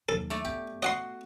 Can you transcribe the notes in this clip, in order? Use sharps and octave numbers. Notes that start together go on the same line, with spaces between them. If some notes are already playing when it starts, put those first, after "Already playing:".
D#2 F#3 A4
A3 D5
B3 G4
F#4 D#5 F#5 C6